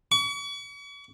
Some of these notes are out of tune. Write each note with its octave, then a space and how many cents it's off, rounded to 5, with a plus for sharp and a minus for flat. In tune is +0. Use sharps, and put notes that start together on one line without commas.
C#6 +40